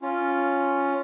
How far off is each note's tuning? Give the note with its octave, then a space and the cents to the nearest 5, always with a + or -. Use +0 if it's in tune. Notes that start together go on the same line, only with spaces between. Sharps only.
C#4 +0 F4 +0